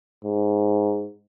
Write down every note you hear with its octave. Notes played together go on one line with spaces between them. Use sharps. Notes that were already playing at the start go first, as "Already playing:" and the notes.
G#2